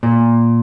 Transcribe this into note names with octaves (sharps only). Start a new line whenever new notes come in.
A#2